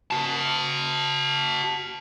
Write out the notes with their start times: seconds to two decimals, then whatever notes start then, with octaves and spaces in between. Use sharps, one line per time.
0.11 F#4 A5